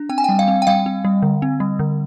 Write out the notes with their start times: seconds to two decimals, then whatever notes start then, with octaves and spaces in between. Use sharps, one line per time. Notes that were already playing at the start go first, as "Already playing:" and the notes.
Already playing: D4
0.09 C4 G5
0.18 G#5
0.24 G3 G5
0.39 F5
0.48 C4
0.62 G5
0.67 G3 F5
0.86 C4
1.05 G3
1.22 D3
1.42 C4
1.60 G3
1.79 D3